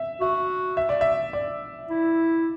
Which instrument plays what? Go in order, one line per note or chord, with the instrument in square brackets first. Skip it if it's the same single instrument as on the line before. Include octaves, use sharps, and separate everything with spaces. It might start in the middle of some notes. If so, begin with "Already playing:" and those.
Already playing: [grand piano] E5
[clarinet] F#4 [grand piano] E5
[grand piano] E5
D5
E5
D5
[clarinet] E4